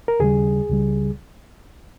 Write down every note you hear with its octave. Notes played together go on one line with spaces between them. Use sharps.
A#4
D#2 C#3 G3 G#4
C#2 C#3 G3